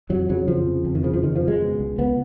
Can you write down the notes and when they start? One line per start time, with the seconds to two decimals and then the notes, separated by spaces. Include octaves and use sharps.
0.09 F2 F#3
0.29 C#3 F#3
0.48 F2 F3
0.66 C#3
0.85 F2
0.95 D#3
1.03 C#3 F3
1.13 F3
1.23 F2 D#3
1.36 F3
1.42 C#3
1.48 G#3
1.60 B2
1.79 C#2
1.98 C#2 B3